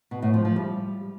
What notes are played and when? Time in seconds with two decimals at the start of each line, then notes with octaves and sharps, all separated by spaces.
0.11 B2
0.22 A2
0.34 F3
0.45 F3
0.56 G3